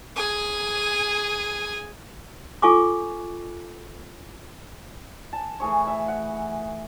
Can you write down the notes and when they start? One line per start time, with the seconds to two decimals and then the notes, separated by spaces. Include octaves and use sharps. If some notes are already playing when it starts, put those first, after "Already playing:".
0.16 G#4 G#5
2.62 F4 A4 G#5 C#6 D6
5.33 A5
5.60 E3 A3 G#4 C#5
5.87 E5
6.08 F#5